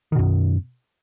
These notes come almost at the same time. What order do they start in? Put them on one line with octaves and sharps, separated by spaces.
D#3 B2 F#2